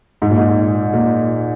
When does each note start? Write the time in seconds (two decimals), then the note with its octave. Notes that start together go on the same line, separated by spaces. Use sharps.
0.22 G#2
0.30 A#2
0.38 G#2
0.93 A#2